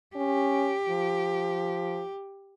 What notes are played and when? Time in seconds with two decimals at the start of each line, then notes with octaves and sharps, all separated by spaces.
0.16 C#4 G4
0.89 F3